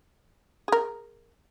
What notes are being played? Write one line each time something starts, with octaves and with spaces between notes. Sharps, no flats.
G#4 A#4